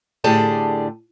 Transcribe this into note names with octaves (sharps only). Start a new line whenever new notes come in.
A2 D3 G4 G#4 D5 A5